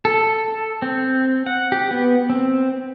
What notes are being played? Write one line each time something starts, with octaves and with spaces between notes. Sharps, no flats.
A4
C4
F#5
G4
B3
C4